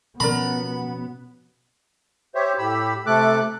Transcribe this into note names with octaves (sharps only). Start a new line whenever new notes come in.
B2 F3 B3 C#4 A#4 D5 A#5 B5
G4 C5 C#5 E5
A2 G4 B5 E6
C3 A3 A4 D6 F#6